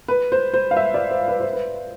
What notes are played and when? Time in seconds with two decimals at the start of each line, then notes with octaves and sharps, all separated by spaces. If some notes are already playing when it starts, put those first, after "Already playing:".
0.08 B4
0.32 C5
0.54 C5
0.71 F5
0.77 E5
0.94 D5
1.11 C5
1.28 B4
1.40 C5
1.53 B4